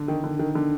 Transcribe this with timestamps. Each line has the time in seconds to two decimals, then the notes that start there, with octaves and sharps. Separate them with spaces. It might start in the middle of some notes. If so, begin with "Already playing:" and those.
Already playing: D3
0.08 D#3
0.24 D3
0.39 D#3
0.55 D3